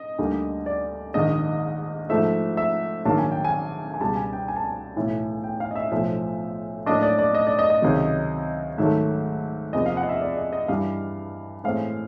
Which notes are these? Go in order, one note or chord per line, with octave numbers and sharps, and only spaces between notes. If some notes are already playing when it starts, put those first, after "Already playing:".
Already playing: D#5
D2 D3 G3 A#3
D5
A#1 G#2 D#3 D#5
G#2 F3 A3 E5
E5
A#1 G#2 D#3 F#3 A#3 A5
G#5
G5
G#5
G#5
C#2 B2 G3 A5
G#5
G5
G#5
A5
G#5
B1 A2 E3
G5
F5
D#5
E5
B1 A2 F3 E5
A2 F#3 A#3 D4 D#5
D5
D5
D#5
D5
D#5
D#5
C#2 C3 D#3 F#3
G#2 D#3 F#3 A3 E5
E2 C3 F3 A#3 D#5
F5
F#5
D#5
E5
D5
D#5
D#5
G2 E3 G3 F5
A2 E3 G#3 C4 F5